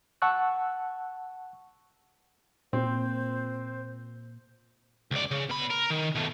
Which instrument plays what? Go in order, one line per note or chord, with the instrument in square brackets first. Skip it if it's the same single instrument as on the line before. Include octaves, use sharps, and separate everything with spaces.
[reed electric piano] F#5 A5 C#6 E6 F#6
[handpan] A#2 [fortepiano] C4 [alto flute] C5
[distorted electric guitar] C#2 D5
C#3
B2 B5
A#4
D#3
B2 A3